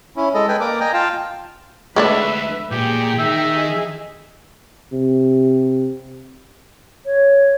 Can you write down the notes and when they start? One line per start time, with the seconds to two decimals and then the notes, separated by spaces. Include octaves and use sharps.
0.16 C#4 E4
0.34 G#3 A4 D#5
0.48 A4 B4 G5 G#5
0.60 A#3 A#4 D5 D6
0.80 D#5 G5 G#5 A#5
0.93 F4 F5 G5 A5
1.96 D2 G#3 A3 D4 B4 E5
2.71 A#2 G4 G#4 G5
3.19 D#3 E5
3.55 G#4 D#5
4.92 C3
7.05 C#5